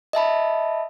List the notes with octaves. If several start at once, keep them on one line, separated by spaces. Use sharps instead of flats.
D#5 E5 A5 B5